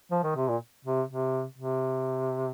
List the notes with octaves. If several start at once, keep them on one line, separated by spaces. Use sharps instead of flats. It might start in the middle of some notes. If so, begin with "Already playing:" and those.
F3
D#3
C3
A#2
C3
C3
C3